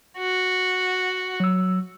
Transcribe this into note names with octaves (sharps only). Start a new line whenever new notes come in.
F#4
F#3 E6